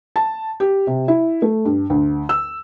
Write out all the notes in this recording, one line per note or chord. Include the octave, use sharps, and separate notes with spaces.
A5
G4
C3
E4
A3
G2
D2
E6